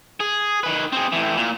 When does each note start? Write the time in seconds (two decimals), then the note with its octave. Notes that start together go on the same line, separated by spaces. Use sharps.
0.20 G#4
0.63 D#3 B4
0.93 C4 G#4
1.13 A2 E3
1.37 A#2